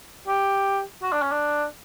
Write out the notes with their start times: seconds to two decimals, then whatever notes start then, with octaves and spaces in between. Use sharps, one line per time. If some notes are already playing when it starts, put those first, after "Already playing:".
0.28 G4
1.03 F#4
1.12 D4
1.22 C#4
1.31 D4